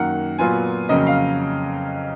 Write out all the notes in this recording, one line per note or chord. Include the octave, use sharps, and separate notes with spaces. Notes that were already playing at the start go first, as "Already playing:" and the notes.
Already playing: F#2 D#3 A#3 F#5
A#2 F#3 B3 F4 G#5
F2 C#3 F#3 A#3 C#4 D#5
F5